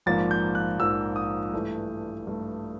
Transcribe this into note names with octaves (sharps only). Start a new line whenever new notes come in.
A#1 G#2 F3 A#3 A6
G6
F#6
A#1 G#2 F3 A#3 E6
D#6
G2 E3 A3
G2 E3 A3